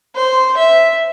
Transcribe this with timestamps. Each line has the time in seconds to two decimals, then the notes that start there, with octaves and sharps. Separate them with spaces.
0.16 C5
0.57 E5